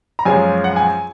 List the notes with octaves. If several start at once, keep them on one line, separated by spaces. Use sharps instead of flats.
A#5
F#2 F3 G#3 C#4 G#5
F#5
G#5